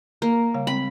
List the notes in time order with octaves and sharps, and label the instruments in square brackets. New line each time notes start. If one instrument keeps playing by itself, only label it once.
[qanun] A#3
[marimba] C#3 G3 F5
[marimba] G3 G#3 C4 [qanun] B5